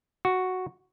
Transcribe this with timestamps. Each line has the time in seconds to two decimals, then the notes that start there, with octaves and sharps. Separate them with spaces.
0.25 F#4